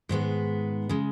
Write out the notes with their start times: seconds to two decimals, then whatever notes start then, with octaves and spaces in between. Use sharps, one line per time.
0.09 G#2 D#3 G#3 B3
0.89 C#3 G#3